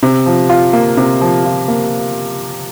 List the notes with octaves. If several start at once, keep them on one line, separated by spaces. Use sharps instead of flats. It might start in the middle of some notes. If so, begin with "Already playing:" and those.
C3
F3
F4
A#3
C3
F3
F4
A#3